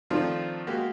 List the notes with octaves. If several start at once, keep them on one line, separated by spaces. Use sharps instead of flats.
D#3 F3 A3 C4 D4 F4
G#3 A#3 F#4 G4